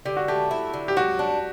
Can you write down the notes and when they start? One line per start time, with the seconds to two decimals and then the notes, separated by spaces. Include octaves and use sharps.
0.05 D3 G4
0.17 F#4
0.28 A3 G4
0.51 E4
0.73 D3
0.88 G4
0.97 F#3 F#4
1.19 D4